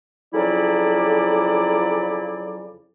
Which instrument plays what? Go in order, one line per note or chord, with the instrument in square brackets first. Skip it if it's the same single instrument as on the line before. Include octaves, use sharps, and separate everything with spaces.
[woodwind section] F2 C#3 F#3 E4 D5